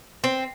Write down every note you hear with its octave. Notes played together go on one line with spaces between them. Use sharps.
C4